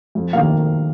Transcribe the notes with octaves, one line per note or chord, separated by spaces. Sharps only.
F2
D#3 A#3 F5